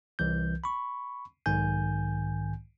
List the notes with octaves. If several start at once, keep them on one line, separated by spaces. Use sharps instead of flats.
C2 E3 G6
B5 C#6
B1 G#2 D#3 G#5 G6